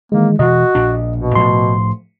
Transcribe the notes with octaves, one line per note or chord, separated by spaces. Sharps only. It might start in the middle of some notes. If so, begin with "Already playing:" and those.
D#3 E3 G#3 A#3
B2 E3 F#4 D#5
A#1 A#2 D4
B2
A2 F3 A3 C6